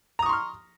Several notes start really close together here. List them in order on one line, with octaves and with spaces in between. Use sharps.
A#5 D#6 C#6 C6 F6